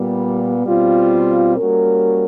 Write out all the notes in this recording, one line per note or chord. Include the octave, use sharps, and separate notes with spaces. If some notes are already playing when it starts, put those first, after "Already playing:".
Already playing: A#2 G3 B3
B2 G3 C4 F4
G3 A#3 C#4 F#4 A#4